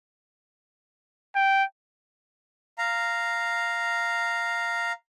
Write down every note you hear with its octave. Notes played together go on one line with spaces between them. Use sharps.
G5
F5 A#5